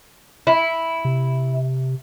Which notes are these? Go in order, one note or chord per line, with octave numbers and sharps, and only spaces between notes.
E4
C3